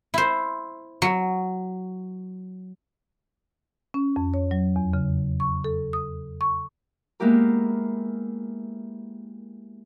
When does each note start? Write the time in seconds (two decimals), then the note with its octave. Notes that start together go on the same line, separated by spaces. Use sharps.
0.14 E4 C5
1.02 F#3
3.94 C#4
4.16 F2
4.34 C#5
4.51 F#3
4.76 E2
4.93 C#3
5.40 C#6
5.64 A4
5.93 D#6
6.41 C#6
7.20 G#3 A#3 B3 E4 G4 A#4